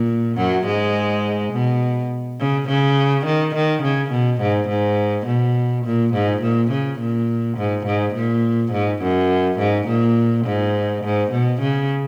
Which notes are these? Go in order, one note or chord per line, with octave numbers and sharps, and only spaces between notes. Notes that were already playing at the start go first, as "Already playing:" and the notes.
Already playing: A#2
F#2 F#3
G#2 G#3
B2
C#3
C#3
D#3
D#3
C#3
B2
G#2
G#2
B2
A#2
G#2
A#2
C#3
A#2
G#2
G#2
A#2
G#2
F#2
G#2
A#2
G#2
G#2
B2
C#3